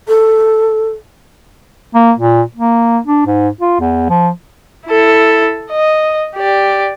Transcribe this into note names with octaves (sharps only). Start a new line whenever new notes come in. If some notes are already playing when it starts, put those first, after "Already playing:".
A4
A#3
A#2
A#3
D4
G#2
F4
E2
F3
E4 A4
D#5
G4 D5